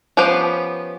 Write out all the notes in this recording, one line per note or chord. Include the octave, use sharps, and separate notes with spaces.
F3 B3 C#4 G4 C5